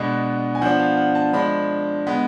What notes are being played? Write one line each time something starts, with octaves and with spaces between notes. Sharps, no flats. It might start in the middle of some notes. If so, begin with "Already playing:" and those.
Already playing: B2 G#3 B3 D4
G#5
F3 B3 D4 F#5
F5
F#5
A5
F3 G#3 D4 B5
D3 G#3 B3